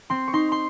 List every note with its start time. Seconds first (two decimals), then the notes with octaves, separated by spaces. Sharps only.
0.10 C4 C6
0.28 C#6
0.33 D#4 C6
0.52 C6